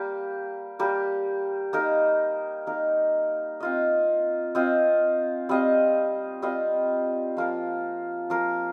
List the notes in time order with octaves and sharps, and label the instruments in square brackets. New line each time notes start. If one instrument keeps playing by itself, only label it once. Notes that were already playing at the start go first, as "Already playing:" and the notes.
Already playing: [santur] G3 A#3 G4
G3 A#3 G4
A#3 D#4 A#4
A#3 D#4 A#4
C4 F4 D#5
C4 F4 D#5
G3 C4 F4 D#5
G3 C4 F4 D#5
F3 A#3 F4 A#4
F3 A#3 F4 A#4